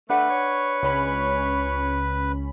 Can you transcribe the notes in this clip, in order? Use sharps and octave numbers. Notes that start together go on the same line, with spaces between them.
A3 D4 B4 F#5
C#5
C#2 C#4 B5